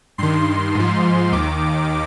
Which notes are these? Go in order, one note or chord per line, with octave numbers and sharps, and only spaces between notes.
G2 D#3 C6
G#2 F3
D#2 D#3 D6